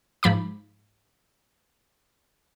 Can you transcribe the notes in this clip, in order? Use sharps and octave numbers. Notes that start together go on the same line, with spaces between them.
G#2 F3 B5 D6